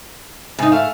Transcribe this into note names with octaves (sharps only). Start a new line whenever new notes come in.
G#2 C3 D#4
A3 F5